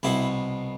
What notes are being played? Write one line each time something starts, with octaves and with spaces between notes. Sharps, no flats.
C2 B2 E4